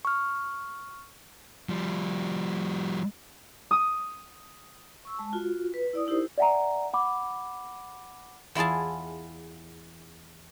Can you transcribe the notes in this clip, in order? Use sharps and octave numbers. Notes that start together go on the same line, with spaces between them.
C#6 F6
F3 G3
D#6
C#6 E6
G#3 A5
F4 F#4
B4
E4 D5 D#6
D#4 E4 G4 A#4 C5
D5 E5 F#5 G#5 A#5
F#5 B5 D6
E2 E4 F4 G#4 A5